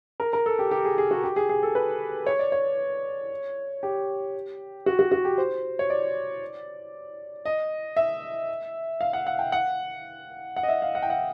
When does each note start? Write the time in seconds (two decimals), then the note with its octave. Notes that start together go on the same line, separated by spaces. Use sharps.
0.20 A#4
0.33 A#4
0.46 A4
0.59 G4
0.71 G4
0.85 G#4
0.98 G#4
1.11 F#4
1.24 G4
1.36 G#4
1.49 G#4
1.63 A4
1.75 B4
2.26 C#5
2.39 D5
2.52 C#5
3.83 G4
4.86 F#4
4.99 F#4
5.12 F#4
5.25 G4
5.38 C5
5.79 C#5
5.90 D5
7.45 D#5
7.96 E5
9.01 F5
9.13 F#5
9.27 F#5
9.39 G5
9.52 F#5
10.56 F#5
10.63 D#5
10.69 E5
10.82 F5
10.95 F#5
11.02 G5
11.10 F#5